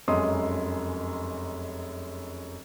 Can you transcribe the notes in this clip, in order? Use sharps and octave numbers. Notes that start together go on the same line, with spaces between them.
F1 F#2 G#3 C6 D#6